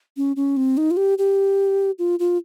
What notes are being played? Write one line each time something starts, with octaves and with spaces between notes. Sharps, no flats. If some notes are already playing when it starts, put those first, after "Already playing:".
C#4
C#4
C4
D#4
F4
G4
G4
F4
F4